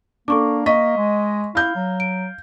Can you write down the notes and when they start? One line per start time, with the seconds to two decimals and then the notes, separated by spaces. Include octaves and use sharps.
0.28 A#3 D4 A4 C#6 D6
0.66 A#3 D#5 C#6 B6
0.97 G#3
1.55 E4 F5 G6
1.76 F#3
2.00 D7